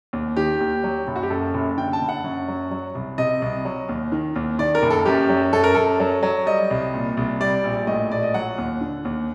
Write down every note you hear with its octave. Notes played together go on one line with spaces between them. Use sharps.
D#2
D#3 G4
D#2
F#3
F#1
F#4
G4
F#2 A4
F#1
D3 G5
A5
F#1
F#5
F#2
F#3
F#3
C2
C3 D#5
C2
F#3
D#2
D#3
D#2
D#3 D5
A#4
F#1
A4
F#2 G4
F#3
F#2 A4
A#4
F#2 A4
F#3
F#3
G3 D#5
C2
A#2
C2
G3 D5
A#1
A2 D#5
A#1 D5
D#5
F#3 F#5
D#2
D3
D#2